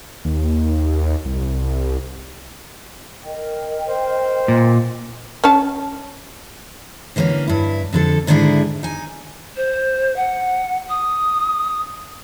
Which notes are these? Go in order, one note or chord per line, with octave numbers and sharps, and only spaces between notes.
D#2
C2
A#4 D#5 G5
C5
A#2
C#4 C#5 A5
D3 E3 A#3 C4 C#4
G2 E4
F2 D3 A4
G#2 D3 D#3 D4 E4 G#4
D#4 G#5
C5
F#5
D#6